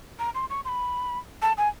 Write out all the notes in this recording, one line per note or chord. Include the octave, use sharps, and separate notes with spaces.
A#5
C6
C#6
C6
B5
A5
G#5